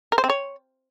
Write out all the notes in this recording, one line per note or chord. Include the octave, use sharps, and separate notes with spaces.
A#4
C5
C4
C#5